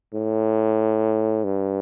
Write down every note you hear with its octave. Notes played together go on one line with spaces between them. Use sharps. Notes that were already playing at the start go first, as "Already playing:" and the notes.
A2
G2